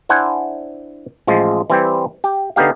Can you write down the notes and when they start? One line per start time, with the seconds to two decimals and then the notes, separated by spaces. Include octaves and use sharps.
0.09 D4 E4 C5 F#5 G#5
1.27 A1 F3 G#3
1.70 E3 G3 C4 E4 G4
2.24 G4
2.56 D3 B3 D#4 G4 F5